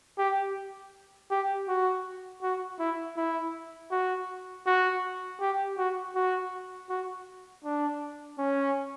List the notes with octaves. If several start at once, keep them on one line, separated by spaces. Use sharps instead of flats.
G4
G4
F#4
F#4
E4
E4
F#4
F#4
G4
F#4
F#4
F#4
D4
C#4